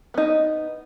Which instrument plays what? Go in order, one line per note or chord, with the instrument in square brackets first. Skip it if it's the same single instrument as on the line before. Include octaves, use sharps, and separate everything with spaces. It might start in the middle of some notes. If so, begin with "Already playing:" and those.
[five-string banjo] B3 D#4